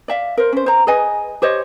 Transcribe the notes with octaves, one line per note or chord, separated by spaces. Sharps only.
D5 E5 F5
A#4 C5
C#4 C5
C5 A#5
G#4 B4 D#5 G#5
G4 C5 C#5 D#5